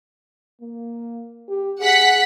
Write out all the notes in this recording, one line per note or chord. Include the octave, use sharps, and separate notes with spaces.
A#3
G4
G#4 F#5 B6